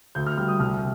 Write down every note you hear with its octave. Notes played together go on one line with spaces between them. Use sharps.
D2 G6
F6
G3 F6
D#6
C2 F6